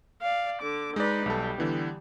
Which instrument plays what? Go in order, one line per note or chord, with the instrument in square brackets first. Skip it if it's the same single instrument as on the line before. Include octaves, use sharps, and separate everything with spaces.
[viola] D5 F5
D3 D6
[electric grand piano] G#3 D5 [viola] D#4 B4
[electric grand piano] B1 A4 [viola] G3
[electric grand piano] D3 E3 B3